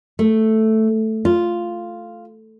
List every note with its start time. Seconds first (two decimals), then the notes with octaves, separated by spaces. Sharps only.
0.19 A3
1.25 F4